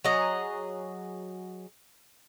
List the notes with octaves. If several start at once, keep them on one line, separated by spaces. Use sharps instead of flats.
F#3 G#4 D#5 A#5